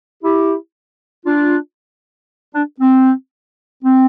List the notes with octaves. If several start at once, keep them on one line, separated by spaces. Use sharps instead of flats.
E4 G4
D4 F4
D4
C4
C4